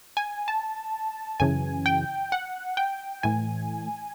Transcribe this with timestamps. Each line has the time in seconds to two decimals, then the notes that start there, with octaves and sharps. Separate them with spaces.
0.17 G#5
0.48 A5
1.40 F#2 C#3 E3 G#5
1.86 G5
2.32 F#5
2.77 G5
3.23 A2 E3 G#5